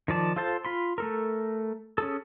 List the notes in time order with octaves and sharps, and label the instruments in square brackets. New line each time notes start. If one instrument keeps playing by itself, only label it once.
[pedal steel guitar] D#3 F3 D5 A5
F4 A4 C5 A5 C6
F4 B5 C6
A3 A4 A#4
C#4 G#4 A4